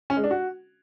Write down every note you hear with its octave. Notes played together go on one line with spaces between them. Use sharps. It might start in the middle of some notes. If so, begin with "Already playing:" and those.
C#4
G#3
D4
F#4